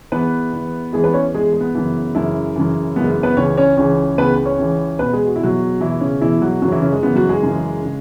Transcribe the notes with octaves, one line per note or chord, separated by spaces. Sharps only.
E2 E3 B3 B4
E2 E3
E2 E3 G#3 G#4
B3 B4
C#4 C#5
E2 E3 G#3 G#4
G#3
B3
F#2 C#3 E3
F#2 C#3 E3 E4
F#2 C#3 E3
F#2 C#3 E3 B3
G#3
B3
B3 B4
C#2 C#3 E3 C#4 C#5
C#4 C#5
C#2 C#3 E3 C#4 C#5
C#2 C#3 E3 B3 B4
C#4 C#5
C#2 C#3 E3
E2 B2 B3 B4
G#3 G#4
F#4
E4
E2 B2 F#3 F#4
E2 B2 E3 E4
C#3 C#4
E2 B2 E3 E4
F#3 F#4
F#2 C#3 E3 F#3 F#4
C#4
E3 E4
C#3 C#4
G#3
F#2 C#3 E3 B3
F#3 F#4
G#3 G#4
F#2 C#3 E3
C#3